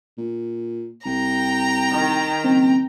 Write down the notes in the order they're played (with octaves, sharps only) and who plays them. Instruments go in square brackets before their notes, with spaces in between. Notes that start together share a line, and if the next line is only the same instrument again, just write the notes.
[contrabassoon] A#2
[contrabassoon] C2 [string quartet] G5 A#5
[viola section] D#3
[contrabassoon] F#1 [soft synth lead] C4